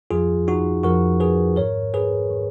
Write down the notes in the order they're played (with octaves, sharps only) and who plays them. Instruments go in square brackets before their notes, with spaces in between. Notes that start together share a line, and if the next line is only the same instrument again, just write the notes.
[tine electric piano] F2 F3 F4 G#4
D#4 F#4
F2 F3 F#4 A#4
G#4 B4
G#2 D#3 A#4 C#5
G#4 B4
D#3